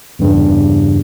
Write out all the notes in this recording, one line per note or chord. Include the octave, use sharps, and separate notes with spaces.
E2 G2 C#3